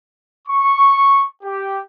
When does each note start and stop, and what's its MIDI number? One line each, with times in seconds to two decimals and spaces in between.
0.48 1.24 85
1.43 1.81 67